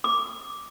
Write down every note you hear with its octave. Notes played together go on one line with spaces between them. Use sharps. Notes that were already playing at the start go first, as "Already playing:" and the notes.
D6